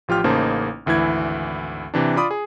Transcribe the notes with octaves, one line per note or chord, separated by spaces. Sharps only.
A1 F3 F4 G4 G5 F6
A1 C#3 A#3 D#4 C5 A5
G#1 D2 E3 E4 G#6
C3 E3 D4
F4 D5 B5 D6 D#6
G#4